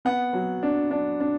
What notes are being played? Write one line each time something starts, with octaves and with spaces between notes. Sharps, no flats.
B3 F#5
F#3
D4
D4
D4